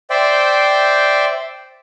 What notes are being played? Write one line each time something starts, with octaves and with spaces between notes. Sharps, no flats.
C5 D5 E5 G5